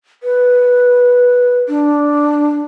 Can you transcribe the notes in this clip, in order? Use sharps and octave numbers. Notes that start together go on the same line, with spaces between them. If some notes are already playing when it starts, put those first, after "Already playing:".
B4
D4